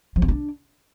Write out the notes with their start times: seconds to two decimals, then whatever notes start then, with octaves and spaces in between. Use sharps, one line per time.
0.16 F3
0.22 C4
0.28 D4